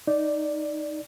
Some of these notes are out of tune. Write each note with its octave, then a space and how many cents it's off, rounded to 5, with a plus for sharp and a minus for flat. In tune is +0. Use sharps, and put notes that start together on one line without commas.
D#4 +0 D5 +0